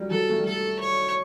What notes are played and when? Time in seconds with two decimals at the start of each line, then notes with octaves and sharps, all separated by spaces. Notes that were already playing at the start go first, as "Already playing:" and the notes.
Already playing: F#3 G3
0.11 F#3 A4
0.29 A3
0.38 G3
0.45 F#3 A4
0.79 C#5